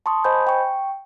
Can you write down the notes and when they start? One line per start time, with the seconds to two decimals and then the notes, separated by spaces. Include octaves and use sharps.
0.06 A5 C6 C#6 D#6
0.24 C5 D#5 G#5 B5 G6
0.47 G5 C#6